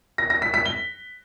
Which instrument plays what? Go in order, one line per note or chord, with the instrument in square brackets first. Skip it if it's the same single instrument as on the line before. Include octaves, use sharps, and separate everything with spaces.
[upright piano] A#6
A#6
B6
B6
G7